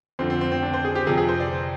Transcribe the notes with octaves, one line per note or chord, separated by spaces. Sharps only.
F2 D3 F3 C4
C4
C4
C4
D4
C5
G#4
G4
F2 C3 F3 G#4
G#4
C5
D5